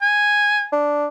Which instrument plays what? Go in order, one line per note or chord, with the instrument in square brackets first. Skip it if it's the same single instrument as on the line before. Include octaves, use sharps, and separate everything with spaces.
[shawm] G#5
[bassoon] D4